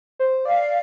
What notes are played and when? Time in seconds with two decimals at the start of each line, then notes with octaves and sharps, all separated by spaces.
0.19 C5
0.45 D5 F5